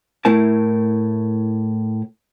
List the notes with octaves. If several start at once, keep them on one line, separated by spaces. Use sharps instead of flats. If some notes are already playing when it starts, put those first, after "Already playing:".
A2 A3 E4 A#4 A5